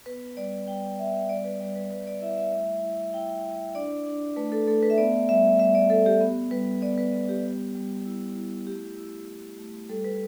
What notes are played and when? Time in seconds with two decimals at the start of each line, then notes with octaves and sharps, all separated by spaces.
0.06 B3 B4
0.37 G3 D5
0.68 G3 G5
0.99 B3 E5
1.29 G3 D5
1.45 B4
1.60 G3 D5
1.76 B4
1.90 G3 B4
2.07 D5
2.21 E4 E5
2.37 E5
2.52 A3
2.83 E4
3.14 E4 G5
3.44 E4
3.75 D4 D5
4.06 D4
4.36 A3 B4
4.52 A4
4.67 A3 A4
4.83 B4
4.90 E5
4.98 B3 D5
5.29 G3 E5
5.59 G3 E5
5.75 D5
5.90 G3 A4
6.06 G4
6.21 B3
6.51 G3 B4
6.82 B3 D5
6.98 B4
7.13 B3
7.29 G4
7.44 G3
7.75 G3
8.05 E4
8.36 E4
8.67 A3 G4
8.98 E4
9.28 E4
9.59 A3
9.89 G3 A4
10.04 B4